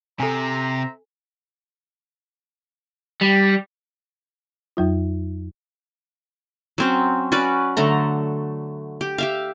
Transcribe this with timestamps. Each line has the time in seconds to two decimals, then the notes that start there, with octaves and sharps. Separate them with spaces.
0.20 C3 A4 C5 E5 G#5 A#5
3.21 G3
4.77 F2 F#3 F4
6.78 F#3 C4 C#4
7.32 C#4 F#4 B4 D5
7.77 D3 F#3 A3 A#5
9.01 G4
9.18 G4 E5 F5